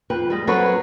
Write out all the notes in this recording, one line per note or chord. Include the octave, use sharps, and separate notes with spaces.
F2 B4 G5
G3 G#3
F#3 C4 A4 B4 C#5